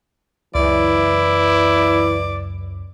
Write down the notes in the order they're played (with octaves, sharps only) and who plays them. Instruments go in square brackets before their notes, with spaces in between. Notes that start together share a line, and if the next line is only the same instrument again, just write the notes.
[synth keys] C#2 F#2 [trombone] E3 [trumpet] E4 [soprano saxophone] D5